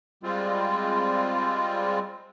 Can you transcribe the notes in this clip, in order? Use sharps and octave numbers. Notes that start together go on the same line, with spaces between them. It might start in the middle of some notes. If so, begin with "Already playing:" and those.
G3 G#3 C4 F4